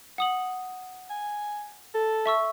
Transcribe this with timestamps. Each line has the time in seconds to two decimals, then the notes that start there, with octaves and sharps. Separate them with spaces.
0.18 F#5 D#6 F#7
1.10 G#5
1.94 A4
2.26 E5 C#6 E6